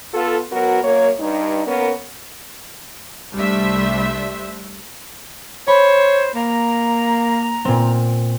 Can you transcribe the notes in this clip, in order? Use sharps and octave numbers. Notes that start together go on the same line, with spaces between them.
B3 F4 A4
F#3 B3 F#4 A#4
F#2 A#3 C#5
G2 D#4
A#3 B3 C#4 A#4
C2 G3 A3 D4 C5 E5
C5 C#5 B5
A#3 A#5
A#2 C4